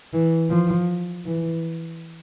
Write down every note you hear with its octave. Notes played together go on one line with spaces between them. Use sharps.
E3
F3
E3